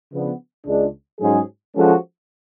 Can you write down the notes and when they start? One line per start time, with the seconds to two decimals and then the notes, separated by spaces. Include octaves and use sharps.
0.12 C#3 F3 B3 D4
0.66 C#2 C#3 G#3 D4
1.20 G#2 F#3 C#4 G#4
1.75 F3 G#3 C#4 F#4 A4